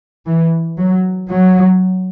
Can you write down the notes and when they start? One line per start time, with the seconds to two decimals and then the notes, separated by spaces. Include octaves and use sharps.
0.26 E3
0.79 F#3
1.31 F#3